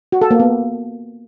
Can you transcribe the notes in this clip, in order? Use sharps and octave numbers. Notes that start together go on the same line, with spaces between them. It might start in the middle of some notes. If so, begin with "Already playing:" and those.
F#4
A4
A#3
B3